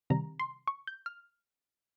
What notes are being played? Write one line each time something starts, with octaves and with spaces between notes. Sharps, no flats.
C3 D#3 G3 A#5
C6
C#6
G6
F6